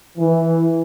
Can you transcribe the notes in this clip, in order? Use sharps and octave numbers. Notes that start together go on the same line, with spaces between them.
E3